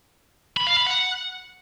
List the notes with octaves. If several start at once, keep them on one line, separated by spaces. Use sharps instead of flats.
B5
F5
B5
F#5